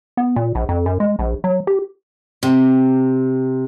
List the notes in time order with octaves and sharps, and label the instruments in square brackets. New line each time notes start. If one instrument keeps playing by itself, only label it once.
[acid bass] B3
A#2
A#1
F2
F#2
G#3
A#1
F#3
G4
[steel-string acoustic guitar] C3